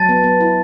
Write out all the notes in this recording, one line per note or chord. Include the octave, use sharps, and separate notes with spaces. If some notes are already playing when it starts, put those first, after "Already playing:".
Already playing: F#3 A5 A6
B3
B3
E4